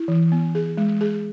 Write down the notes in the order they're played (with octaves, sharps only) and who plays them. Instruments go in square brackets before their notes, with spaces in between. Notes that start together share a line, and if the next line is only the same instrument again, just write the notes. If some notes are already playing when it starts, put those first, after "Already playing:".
Already playing: [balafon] E4
E3
B3
G#4
G#3
G#4